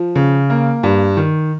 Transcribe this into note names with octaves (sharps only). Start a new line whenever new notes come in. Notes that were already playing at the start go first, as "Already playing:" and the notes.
Already playing: F3
C#3
A#3
G2
D#3